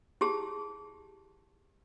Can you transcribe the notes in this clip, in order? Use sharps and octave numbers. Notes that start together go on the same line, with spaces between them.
E4 G4 G#4 A5